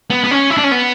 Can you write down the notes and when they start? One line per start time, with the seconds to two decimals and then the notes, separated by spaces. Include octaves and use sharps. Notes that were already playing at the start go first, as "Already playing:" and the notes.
0.10 B3
0.24 B3
0.31 C#4
0.50 E4
0.57 D4
0.64 C#4
0.72 B3